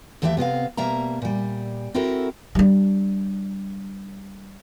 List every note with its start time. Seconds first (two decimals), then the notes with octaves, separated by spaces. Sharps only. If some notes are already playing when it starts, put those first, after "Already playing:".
0.22 D#2 E3 A3 G4 C5 E5
0.37 C3 B3 C4 F5
0.77 B2 G3 A#3 E5 A#5
1.22 A#2 G3
1.94 C4 E4 F#4 A4 A#4
2.55 G3 D4